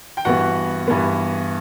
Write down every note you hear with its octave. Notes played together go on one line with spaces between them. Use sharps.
G5
G2 E3 B3 F#4 F#5
G2 E3 B3